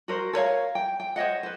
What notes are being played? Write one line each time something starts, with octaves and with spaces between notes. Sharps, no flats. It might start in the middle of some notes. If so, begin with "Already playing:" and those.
F#4 A#4 C5
A4 A#4 C#5 F5
G5
G5
C5 C#5 D#5 F#5
B4 C5